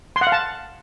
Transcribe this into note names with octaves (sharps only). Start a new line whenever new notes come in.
C6
F#5
F5
A5